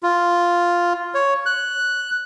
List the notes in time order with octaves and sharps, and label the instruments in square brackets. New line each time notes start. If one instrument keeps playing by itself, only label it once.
[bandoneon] F4
C#5
F#6